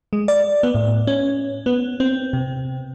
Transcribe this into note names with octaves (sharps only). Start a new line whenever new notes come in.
G#3
D5
B3
A2
C#4
B3
C4
C3